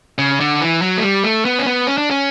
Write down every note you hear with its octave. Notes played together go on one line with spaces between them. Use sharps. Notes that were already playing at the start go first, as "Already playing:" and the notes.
C#3
D3
E3
F#3
A3
G3
A3
B3
C#4
B3
C#4
D4
C#4